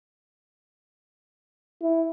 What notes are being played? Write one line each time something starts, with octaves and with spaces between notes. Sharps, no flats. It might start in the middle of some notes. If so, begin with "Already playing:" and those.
E4